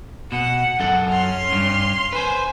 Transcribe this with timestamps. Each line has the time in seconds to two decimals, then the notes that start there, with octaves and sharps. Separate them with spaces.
0.32 B2 F#5
0.80 F#2 A4 F#5
1.11 C#4 C6 F6
1.52 G2
2.13 B4 C5 G#5